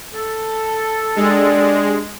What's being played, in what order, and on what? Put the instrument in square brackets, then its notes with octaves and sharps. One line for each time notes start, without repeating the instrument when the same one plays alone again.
[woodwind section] A4
[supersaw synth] G#3 [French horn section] D4 G4